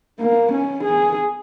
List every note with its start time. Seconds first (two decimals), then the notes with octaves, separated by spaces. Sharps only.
0.20 A#3
0.52 C#4
0.84 G#4